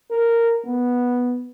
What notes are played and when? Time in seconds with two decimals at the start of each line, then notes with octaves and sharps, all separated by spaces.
0.11 A#4
0.65 B3